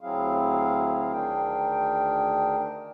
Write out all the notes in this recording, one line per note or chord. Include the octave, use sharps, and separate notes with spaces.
D2 F#3 C4 E4 G#4 F5
D2 D#3 D4 G#4 A#4 G5